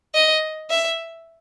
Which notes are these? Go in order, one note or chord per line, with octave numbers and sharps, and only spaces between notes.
D#5
E5